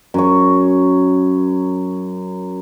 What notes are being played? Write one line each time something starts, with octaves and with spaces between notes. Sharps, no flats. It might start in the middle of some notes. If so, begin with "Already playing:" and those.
F#2 C#5